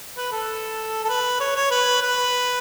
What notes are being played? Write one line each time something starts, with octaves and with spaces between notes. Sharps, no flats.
B4
A4
A4
B4
C#5
C#5
B4
B4